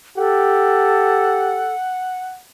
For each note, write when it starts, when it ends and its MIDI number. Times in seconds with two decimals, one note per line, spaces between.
0.17 1.66 67
0.17 1.75 69
0.17 2.40 78